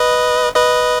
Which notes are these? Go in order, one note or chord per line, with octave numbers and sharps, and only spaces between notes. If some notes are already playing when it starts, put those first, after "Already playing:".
Already playing: B4 D#5
B4 D#5